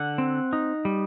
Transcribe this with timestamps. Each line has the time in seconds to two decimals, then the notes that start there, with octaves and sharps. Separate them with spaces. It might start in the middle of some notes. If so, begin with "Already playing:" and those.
Already playing: D3 F#5
0.18 C4
0.53 D#4
0.85 G3